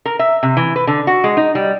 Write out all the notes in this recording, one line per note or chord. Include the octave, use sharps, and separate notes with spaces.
A#4
E5
C3
E3
B4
D3
F#4
G#3
D#4
G3